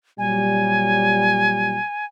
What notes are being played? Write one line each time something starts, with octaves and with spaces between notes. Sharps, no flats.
A#2 F#3 G3 G#5